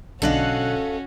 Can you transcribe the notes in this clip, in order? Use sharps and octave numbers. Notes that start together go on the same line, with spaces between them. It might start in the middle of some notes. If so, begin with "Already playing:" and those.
B1 D3 C#4 F#4 A4 D#5 F5 F#6